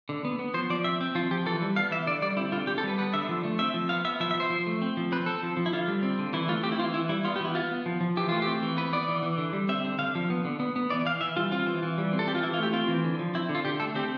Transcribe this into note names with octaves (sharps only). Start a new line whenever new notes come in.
D3
B3
B3
F3 C5
F3 D5
C4 E5
C4
F3 F4
F3 G4
E3 A4
G3
B3 F5
E3 E5
D3 D5
G3 D5
C4 E4
D3 F4
D3 G4
A4
G3 B4
B3 B4
D3 E5
F3
A3
C4 E5
F3
B3 F5
B3 E5
F3 E5
E5
F3 C5
F3
A3
C4
F3
C4 B4
C4 A4
F3
F3
E4
D3 F4
G3
C4
D3
E3 E4
A3 F4
C4 G4
E4
E3 F4
E3 E4
G3 E4
B3 F4
G4
E3 E4
B3 F4
B3
F3
F3
E3 G4
A3 F4
C4 G4
E3
B3 B4
B3 D5
E3
E3
D3
G3
C4 E5
D3
D3 F5
F3
B3
D3
B3
B3
E3 D5
E3 F5
E3 E5
G3 F4
C4 F4
E3
E3
G3
C4
A4
E3 G4
F4
E3 E4
F4
A3 G4
C4 F4
E3
D3
F3
C4 E4
D3
F4
D3 G4
A3 A4
C4 G4